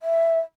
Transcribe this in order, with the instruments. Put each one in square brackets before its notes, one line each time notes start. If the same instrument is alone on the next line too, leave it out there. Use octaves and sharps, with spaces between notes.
[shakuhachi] E5